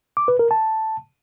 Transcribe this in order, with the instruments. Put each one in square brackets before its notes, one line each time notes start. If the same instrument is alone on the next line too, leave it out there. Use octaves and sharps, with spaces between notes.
[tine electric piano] D6
B4
A#4
A5